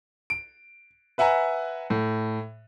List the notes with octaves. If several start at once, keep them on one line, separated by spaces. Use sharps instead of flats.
D7
B4 E5 F#5 G#5 A#5
A2